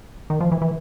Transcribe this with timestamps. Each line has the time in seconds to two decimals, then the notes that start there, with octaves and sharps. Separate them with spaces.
0.30 D#3
0.40 F3
0.52 E3
0.62 E3